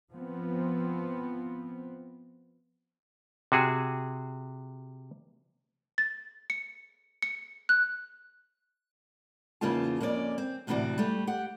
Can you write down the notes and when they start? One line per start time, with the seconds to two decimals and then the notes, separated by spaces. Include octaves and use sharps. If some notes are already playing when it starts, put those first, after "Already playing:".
0.12 F3 B3 C4
3.52 C3 F#4 G#4
5.98 A6
6.50 C#7
7.22 C#7
7.69 F#6
9.61 E2 C#3 A#3 D#4 F4 A5
10.00 F2 A#3 C#4 A#4 D5
10.38 C4
10.67 D2 A2 C3 E3 F#4 D5
10.98 G3 A3
11.27 G4 F#5